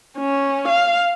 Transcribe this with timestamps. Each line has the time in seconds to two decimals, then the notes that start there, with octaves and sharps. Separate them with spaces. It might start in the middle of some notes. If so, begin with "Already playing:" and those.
0.18 C#4
0.68 F5